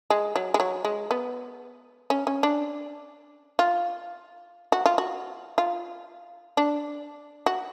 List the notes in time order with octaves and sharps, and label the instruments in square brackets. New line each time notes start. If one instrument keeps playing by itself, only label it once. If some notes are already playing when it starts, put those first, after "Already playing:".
[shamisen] G#3
F#3
G#3
F#3
G#3
B3
C#4
C#4
D4
F4
F#4
F4
F#4
F4
D4
F#4